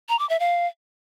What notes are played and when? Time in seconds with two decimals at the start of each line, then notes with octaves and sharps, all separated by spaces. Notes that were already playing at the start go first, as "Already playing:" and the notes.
0.09 A#5
0.19 D6
0.29 E5
0.40 F5